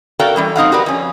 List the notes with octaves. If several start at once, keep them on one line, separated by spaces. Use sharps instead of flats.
F#4 A4 A#4 D5 F5 G5
E3 G3 C#4
C4 D#4 F5 F#5
F#4 G4 A#4 B4 D5
F2 C#4